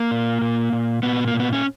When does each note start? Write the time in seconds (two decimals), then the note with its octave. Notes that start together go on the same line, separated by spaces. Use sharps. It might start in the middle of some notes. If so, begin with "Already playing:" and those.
Already playing: A#3
0.11 A#2
0.42 A#2
0.73 A#2
1.03 A#2 B3
1.27 A#3
1.34 A#2
1.40 B3
1.53 C#4